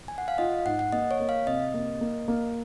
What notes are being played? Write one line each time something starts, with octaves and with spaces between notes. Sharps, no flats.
G#5
F#5
F5
F4 D#5
G#2 F#5
F#5
A#3 D#5
C#5
A#3
F5
C3 D#5
A#3
A#3
A#3